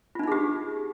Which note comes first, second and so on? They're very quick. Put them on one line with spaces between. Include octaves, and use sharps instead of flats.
F4 D4 D#4 G#4 G4